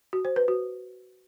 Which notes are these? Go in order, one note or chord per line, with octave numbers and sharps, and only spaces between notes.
F#4
C5
B4
F#4